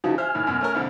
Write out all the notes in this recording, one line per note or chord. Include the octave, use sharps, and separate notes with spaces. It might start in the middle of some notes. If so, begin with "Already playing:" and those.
C#3 E3 F3 D#4 F#4 A5
C5 E5 G#5 F6
A2 D#3
F#2 B2
A3 C#4 A#4
C2 F2 D3